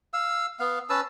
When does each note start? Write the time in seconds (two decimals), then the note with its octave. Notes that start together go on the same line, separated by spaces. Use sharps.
0.14 F5 E6
0.60 B3 F5
0.90 C#4 B4 A5 E6